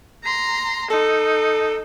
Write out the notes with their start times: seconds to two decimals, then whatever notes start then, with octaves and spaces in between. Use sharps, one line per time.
0.24 A#5 C6
0.90 D#4 A4